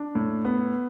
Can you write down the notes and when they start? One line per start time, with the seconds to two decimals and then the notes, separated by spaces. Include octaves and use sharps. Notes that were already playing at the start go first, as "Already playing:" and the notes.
Already playing: D4
0.15 A2
0.45 B3